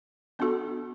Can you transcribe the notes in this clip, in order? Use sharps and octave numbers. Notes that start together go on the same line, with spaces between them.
B3 D4 F#4 A4